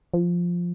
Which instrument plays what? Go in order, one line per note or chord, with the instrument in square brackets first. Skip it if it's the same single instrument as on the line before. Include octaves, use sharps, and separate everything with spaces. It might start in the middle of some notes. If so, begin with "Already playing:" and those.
[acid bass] F3